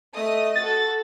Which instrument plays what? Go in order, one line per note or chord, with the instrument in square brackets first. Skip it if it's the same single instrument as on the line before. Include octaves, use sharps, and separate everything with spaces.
[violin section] A3 D#5 D#6
[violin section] F#4 A4 [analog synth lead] A6